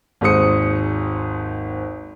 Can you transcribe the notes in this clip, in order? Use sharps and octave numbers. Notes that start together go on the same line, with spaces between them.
G#1 D#2 G#3 C5 D#6 C#7